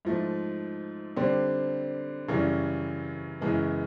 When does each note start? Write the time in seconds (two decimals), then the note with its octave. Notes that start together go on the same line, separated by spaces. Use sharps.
0.05 G#2 F3 A3
1.16 D3 G3 C4
2.28 F#2 C#3 E3 G3
3.41 F#2 C#3 E3 G#3 B3